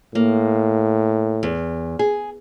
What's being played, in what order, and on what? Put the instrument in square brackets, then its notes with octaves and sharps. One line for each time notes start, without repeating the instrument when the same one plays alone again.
[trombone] A2 [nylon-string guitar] A#3
[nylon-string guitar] E2
G#4